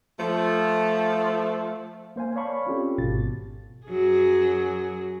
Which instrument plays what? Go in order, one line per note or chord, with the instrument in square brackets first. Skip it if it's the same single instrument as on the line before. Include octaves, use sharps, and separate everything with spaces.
[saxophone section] F3 A3
[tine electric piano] A#3 C5 F5 G#5
C#5 D5 F5 A5 B5 C#6
C4 C#4 F4 G4 A4
G#1 G#2 B2 A6
[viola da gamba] F#2 F#3 G#4